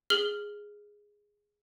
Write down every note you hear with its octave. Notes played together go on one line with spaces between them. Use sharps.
G#4 F6 F#7 G7